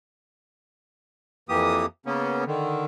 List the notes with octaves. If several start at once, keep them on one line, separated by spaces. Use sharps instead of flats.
F2 E3 A#3 G4 D#6
C#3 A#3 B3 C#4
D3 D#3